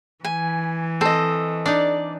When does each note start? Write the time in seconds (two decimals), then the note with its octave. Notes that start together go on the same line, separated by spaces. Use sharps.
0.25 E3 G#5
1.01 C4 A4 D#5
1.66 D4 D#4 D5